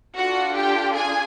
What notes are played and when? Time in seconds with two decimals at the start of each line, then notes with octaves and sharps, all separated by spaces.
0.17 D4 F4 F#4 A4 F#5
0.56 G4 G5
0.95 G#4 G#5